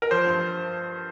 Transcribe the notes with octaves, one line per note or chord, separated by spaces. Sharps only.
A#4
F3 C5
G2